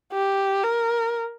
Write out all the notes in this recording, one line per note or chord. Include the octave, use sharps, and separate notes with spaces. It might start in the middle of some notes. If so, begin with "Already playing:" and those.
G4
A#4